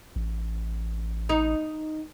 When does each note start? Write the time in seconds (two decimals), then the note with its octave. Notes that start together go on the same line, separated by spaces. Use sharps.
0.16 A1
1.29 D#4